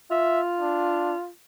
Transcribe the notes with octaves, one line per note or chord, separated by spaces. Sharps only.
F4 E5
D4